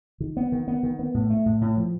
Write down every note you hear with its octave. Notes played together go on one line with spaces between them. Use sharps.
D#3
B3
D#3
B3
D#3
B3
A2
A3
A2
A2
F3